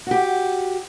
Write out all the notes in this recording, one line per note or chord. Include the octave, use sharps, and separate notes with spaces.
F#4 G4